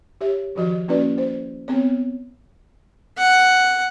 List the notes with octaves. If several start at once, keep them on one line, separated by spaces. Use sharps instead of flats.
G4 C#5 E5
D#3 F3 F#4 D#5
A#3 C#4 E4 F#4 B4 D5
C5
B3 C4 C#5
F#5